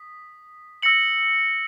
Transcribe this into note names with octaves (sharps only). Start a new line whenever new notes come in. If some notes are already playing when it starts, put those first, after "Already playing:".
Already playing: D#6 B6
E6 A#6 C#7 F#7